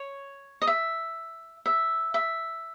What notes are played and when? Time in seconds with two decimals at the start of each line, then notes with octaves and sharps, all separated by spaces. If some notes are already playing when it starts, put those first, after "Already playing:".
Already playing: C#5
0.62 D#5
0.67 E5
1.66 E5
2.14 E5